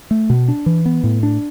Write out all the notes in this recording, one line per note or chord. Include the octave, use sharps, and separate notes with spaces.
A3
B2
D4
E3
B3
A2
D4